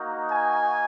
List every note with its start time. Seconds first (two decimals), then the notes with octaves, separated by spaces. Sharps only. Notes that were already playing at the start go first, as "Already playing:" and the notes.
Already playing: A#3 D#4 F#4
0.29 G#5